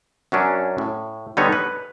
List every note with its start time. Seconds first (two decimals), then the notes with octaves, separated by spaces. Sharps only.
0.32 F#2 F#3 C#4 D4
0.78 A2
1.37 D3 G3 B3 D#4 C#5
1.52 B4